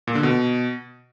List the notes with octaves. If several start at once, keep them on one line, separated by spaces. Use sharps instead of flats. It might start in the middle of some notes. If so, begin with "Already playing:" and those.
A#2
D3
B2